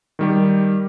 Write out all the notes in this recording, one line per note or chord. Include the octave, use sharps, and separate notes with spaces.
D#3 G3 G4